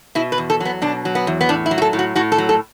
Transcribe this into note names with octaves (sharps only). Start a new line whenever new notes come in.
B2 E4
B4
E2
A4
F#3 B3
B2 D4
F#3
B3
E2
B3
A2 D4
E4
F#3
F#4
A4
A2
F#4
A2 F#4
A4
F#3
A4